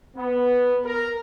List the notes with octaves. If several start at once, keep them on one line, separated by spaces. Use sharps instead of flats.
B3
A#4